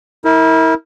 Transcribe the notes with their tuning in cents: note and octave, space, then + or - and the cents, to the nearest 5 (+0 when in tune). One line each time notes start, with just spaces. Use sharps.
E4 -35 A#4 -15